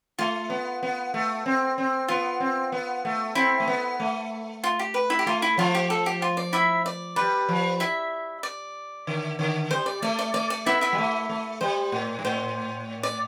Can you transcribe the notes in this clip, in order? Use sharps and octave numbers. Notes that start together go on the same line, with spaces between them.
A3 F4
B3
B3
A3
C4
C4
B3 F4
C4
B3
A3
C4 E4
A3
B3
A3
F4
G4
B4
E4
G4
A3 F4
E4
F3 F4
G4
A4
G4
F4
D5
E4 E5
D5
G3 B4
F3
E4 E5
D5
D3
D3
G3 C5
D5
A3 D5
D5
A3 D5
D5
B3 E4 E5
E4 E5
G3
A3
A3
G3 C5
A2
G2
A2 C5
D5